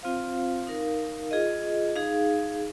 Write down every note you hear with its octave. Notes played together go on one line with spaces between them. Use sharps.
C4 F4 C5 F5
D#4 A#4 F5
F4 G#4 D#5
D#4 G#4 F5